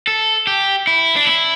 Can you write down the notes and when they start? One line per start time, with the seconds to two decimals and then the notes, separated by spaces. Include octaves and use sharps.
0.07 A4
0.47 G4
0.87 E4
1.16 D4
1.27 E4